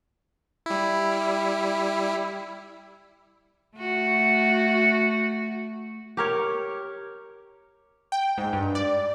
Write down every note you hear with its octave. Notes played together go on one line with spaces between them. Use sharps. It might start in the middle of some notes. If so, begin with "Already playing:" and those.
G3 E4
A3 F#4
G4 A#4 C#5
G5
G#2
G2
D5